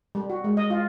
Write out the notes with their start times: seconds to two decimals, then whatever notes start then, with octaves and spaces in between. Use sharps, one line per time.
0.15 G3
0.30 F#4
0.44 G#3
0.57 D#5
0.70 F4